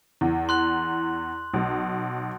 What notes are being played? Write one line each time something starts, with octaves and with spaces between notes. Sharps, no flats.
E2
C6 F#6 F#7
B1